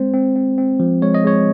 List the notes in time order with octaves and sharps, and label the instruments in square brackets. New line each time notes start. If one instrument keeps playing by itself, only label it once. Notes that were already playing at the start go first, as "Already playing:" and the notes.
Already playing: [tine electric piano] G#3 C4 C5
C4
C4
C4
F3
G#3 C#5
D#5
G#3 C#5